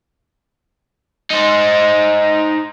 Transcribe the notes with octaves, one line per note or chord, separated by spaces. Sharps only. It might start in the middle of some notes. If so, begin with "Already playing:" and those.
D#4 C5